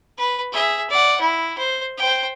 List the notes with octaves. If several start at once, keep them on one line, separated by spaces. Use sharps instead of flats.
B4
G#4 E5
D5 F#5
E4
C5
C5 G5